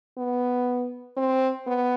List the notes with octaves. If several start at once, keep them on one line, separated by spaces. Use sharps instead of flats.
B3
C4
B3